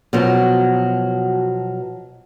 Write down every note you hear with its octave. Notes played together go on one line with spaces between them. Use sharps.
B2 F3 F#3 B3